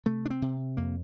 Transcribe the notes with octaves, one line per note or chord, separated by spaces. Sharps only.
C3 A3
D4
C4
C3
F2 A#3